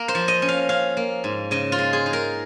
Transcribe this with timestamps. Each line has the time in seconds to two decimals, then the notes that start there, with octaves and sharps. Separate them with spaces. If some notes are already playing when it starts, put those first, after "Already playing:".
Already playing: A#3 A#4
0.08 C5
0.15 F3
0.28 D#5
0.42 C#4
0.48 F5
0.69 C#4 F5
0.97 A#3
1.24 G#2
1.51 C#3 D#5
1.72 F4
1.78 G#3
1.93 G#4
2.06 D#4
2.13 A#4